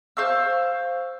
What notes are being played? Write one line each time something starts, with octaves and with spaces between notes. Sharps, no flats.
C5 F5 C#6 E6